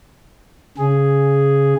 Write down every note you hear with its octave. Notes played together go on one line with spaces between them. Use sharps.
C#3 G#4